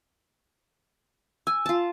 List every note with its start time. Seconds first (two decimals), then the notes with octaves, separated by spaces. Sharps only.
1.47 G#5 E6
1.66 F4 A5